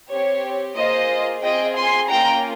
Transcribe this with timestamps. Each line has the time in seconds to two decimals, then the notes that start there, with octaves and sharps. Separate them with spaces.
0.11 C4 G4 C#5
0.77 A#3 F4 G#4 C5 D#5
1.43 C4 F4 G#4 D#5 G5
1.76 G#5 C6
2.10 A#3 C#4 F4 G5 A#5